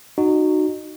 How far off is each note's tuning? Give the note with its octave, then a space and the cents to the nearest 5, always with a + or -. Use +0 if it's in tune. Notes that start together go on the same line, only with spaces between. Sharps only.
D#4 -25 F#4 +0